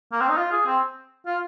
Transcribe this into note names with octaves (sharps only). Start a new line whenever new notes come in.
A#3
C4
D#4
F4
G#4
C4
F4